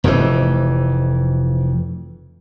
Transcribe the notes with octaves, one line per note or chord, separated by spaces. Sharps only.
F1 F2 C3 E3